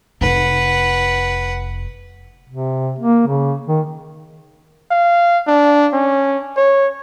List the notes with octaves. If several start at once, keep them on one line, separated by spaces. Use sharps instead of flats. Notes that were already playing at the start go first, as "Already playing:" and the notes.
F1 D#4 B4 F#5
C3
A#3
C#3
D#3
F5
D4
C#4
C#5